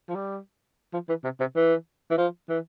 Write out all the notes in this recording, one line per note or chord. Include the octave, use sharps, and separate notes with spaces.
F3
G3
F3
E3
C3
C3
E3
E3
F3
E3